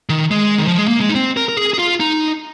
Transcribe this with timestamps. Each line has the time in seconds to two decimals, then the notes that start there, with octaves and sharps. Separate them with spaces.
0.09 D#3
0.31 G#3
0.58 D#3
0.68 F3
0.78 G#3
0.88 A#3
1.01 G#3
1.09 D#4
1.15 C4
1.37 A#4
1.49 A#4
1.57 G#4
1.74 G#4
1.79 F4
2.00 D#4